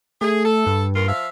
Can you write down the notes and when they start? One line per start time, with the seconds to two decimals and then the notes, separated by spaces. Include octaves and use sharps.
0.21 A3 G#4
0.45 A4
0.67 G2
0.95 D#2 F4 A#4
1.08 F3 E5 F5